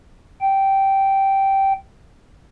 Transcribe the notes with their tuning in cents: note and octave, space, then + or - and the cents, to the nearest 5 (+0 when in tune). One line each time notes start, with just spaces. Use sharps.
G5 -10